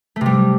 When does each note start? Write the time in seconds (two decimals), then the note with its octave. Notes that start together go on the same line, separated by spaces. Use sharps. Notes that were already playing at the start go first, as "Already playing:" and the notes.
0.16 A3
0.21 C3
0.26 G3